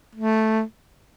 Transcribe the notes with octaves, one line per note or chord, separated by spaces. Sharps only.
A3